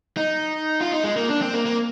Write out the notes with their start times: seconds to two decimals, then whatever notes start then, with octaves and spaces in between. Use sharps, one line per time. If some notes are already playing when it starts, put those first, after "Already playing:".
0.17 D#4
0.81 F4
0.91 D#4
1.04 G#3
1.16 A#3
1.29 D4
1.42 C4
1.54 A#3
1.66 A#3